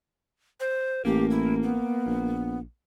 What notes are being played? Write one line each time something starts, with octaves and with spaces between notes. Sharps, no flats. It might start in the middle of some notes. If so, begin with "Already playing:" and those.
C5
A1 A#3 G4
E4
B3
A#1